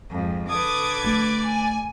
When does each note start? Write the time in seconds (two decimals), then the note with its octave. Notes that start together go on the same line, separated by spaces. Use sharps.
0.10 F2 G#2
0.49 D3 A4 B4 D6 D#6 G#6 D7
1.05 A3 D5
1.48 G#5